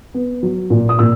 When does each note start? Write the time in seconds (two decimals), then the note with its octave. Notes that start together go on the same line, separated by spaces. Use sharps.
0.14 B3
0.43 F#3
0.70 A#2
0.89 D#6
0.99 A#2 E6